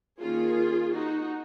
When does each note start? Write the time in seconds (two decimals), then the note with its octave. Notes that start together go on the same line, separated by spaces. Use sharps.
0.21 D#3 A#3 C#4 F4 G#4
0.93 D#4 F#4